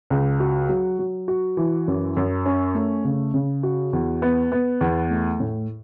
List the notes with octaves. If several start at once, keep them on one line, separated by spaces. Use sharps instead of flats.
C#2
F#4
F#3
F#3
F#4
E3
F#2
F#2
C#4
A3
C#3
C#3
F#4
E2
B3
B3
E2
A3
A2